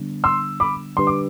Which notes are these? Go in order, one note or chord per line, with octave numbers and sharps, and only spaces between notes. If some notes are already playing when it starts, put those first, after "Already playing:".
Already playing: D3 G3 B3 D4
C6 E6
B5 D6
D3 G3 D4 G4 B4 C6
D6